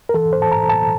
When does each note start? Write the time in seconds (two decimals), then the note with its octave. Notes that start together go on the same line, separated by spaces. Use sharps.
0.09 A#4
0.14 E3 A4
0.33 C5
0.39 A2 A5
0.52 A#5
0.64 A2
0.69 A5